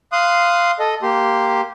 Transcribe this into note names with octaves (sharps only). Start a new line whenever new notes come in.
F5 C6 D#6 F#6
A4 D#5
A#3 G4 C6